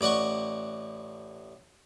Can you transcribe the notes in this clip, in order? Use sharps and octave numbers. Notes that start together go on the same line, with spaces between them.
A1 D5 D#5 F#5 C#6